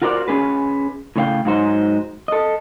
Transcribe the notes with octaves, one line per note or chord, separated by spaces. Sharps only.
F4 F#4 A#4 C5 D5
C#4 G#4 B4
A2 C#3 A3 C#5 F5 G5
G#2 F#3 D#4 C5
A4 D#5